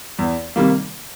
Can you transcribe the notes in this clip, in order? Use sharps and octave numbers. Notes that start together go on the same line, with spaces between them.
E2
C3 D#3 G3 A#3